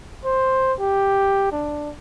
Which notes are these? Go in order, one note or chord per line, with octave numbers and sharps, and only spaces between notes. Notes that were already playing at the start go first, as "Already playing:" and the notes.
C5
G4
D4